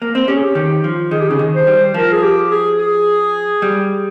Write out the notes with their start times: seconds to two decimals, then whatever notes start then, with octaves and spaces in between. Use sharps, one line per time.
0.02 A#3
0.15 C4
0.28 C#4 G4
0.35 G#4
0.43 G4
0.55 D#3
0.84 F3
1.11 D#3 G#4
1.21 G4
1.29 C#3 G#4
1.39 D#3
1.54 C5
1.67 G3
1.94 F3 A#4
2.12 G#4
2.23 G4
2.51 G#4
2.78 G#4
3.62 G3